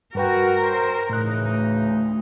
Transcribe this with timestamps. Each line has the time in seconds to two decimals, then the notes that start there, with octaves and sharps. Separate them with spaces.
0.15 G2 F#4 A#4 B4 G5
0.62 C5
1.10 A2 C#3 E3 D#4 F#6
1.43 D2